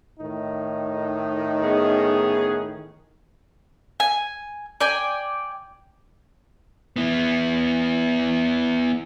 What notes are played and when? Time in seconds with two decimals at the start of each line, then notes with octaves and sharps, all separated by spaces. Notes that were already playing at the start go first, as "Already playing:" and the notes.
0.20 A2 D#3 D#4
1.62 B3 C#4 G#4
4.00 G#5
4.81 D5 G5 G#5
6.96 B3 E4